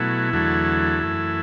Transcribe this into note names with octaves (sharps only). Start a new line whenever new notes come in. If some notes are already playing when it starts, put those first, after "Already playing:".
Already playing: B2 F#3 A3 E4
E2 D3 F#3 A3
F#2 E3 A3